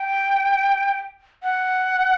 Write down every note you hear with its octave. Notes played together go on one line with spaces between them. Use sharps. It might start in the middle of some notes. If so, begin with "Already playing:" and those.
Already playing: G5
F#5